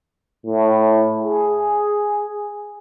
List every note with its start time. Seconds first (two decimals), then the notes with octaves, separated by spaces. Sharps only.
0.46 A2
1.24 G#4